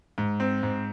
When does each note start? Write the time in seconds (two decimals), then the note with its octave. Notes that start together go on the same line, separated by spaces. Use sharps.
0.18 G#2
0.40 C4
0.63 G#2